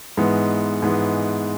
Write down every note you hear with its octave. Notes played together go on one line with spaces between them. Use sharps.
G#2 E3 G#3 B3
G#2 E3 G#3 B3